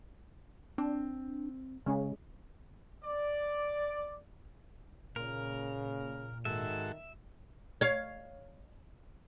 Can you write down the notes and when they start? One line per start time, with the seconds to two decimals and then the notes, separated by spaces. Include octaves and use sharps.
0.78 C4 D4
1.86 C#3 G#3 C#4 G#4
3.04 D5
5.16 A#2 C#3 A#4
6.45 G#2 D#3 F#4 A4 E5
7.81 C#5 F5